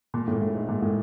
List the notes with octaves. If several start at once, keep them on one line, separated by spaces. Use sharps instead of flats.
A#2
A2
A2
G#2
A#2
A2